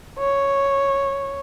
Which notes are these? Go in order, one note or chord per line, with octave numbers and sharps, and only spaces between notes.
C#5